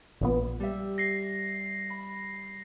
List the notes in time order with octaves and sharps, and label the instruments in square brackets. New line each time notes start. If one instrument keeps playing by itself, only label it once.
[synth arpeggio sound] A#1 A#2 B3
[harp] G3 E5
[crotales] A#6 C7
[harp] B5